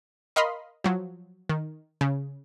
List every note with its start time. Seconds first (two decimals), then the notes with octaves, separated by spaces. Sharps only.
0.36 A#4 D#5 F5 B5 C6
0.84 F3 F#3
1.49 D#3
2.01 C#3